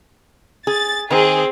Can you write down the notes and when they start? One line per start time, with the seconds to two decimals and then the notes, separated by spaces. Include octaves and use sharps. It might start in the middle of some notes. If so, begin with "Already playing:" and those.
0.67 G#4 A6
1.11 D#3 C4 G#4